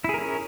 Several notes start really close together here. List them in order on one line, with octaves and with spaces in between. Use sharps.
E4 G#4 A#4 C#4